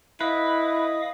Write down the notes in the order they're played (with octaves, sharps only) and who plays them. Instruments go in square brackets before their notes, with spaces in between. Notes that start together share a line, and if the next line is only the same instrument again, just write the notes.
[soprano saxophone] E4 [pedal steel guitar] B4 [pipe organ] D#5 F5 D#6